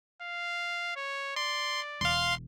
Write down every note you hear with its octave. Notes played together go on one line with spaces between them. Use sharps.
F5
C#5
D5 C6
E1 F5 C6